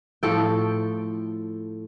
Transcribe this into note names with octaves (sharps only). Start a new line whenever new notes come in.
A2 F3 A4 G5